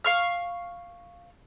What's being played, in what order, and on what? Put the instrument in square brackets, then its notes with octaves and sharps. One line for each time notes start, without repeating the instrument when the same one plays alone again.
[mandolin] F5 C#6 F6